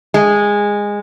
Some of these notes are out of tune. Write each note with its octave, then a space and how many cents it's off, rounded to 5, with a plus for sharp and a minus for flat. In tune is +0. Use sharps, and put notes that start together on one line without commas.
G#3 -15